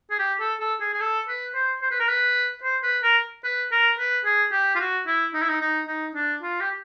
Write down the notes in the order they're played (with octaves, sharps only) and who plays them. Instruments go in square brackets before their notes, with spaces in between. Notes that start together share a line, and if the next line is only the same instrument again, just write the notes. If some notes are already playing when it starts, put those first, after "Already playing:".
[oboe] G#4
G4
A4
A4
G#4
G#4
A4
B4
C5
C5
B4
A#4
B4
C5
B4
A#4
B4
A#4
B4
G#4
G4
F4
F#4
E4
D#4
E4
D#4
D#4
D#4
D4
F4
G4